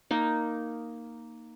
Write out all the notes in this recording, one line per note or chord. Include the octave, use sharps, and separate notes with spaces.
A#3 D#4